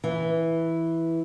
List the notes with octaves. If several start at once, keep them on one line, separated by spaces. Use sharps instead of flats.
E3